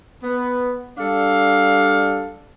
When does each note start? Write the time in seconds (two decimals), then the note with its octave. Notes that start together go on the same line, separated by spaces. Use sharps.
0.22 B3
0.98 G3 D4 A4 F5